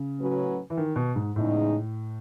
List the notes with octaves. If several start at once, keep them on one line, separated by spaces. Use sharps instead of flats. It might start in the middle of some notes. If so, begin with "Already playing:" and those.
Already playing: C#3
A2 F#3 C#4 F#4 B4
E3
D#3
B2
G#2
E2 A2 C#3 G#3 D#4